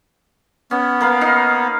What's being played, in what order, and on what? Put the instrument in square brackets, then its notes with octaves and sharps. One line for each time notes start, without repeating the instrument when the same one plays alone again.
[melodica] B3 [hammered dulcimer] C#4
[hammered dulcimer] A#3 B4 F5
D#4 F5